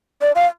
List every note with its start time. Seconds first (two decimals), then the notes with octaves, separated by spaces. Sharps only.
0.22 D5
0.35 F5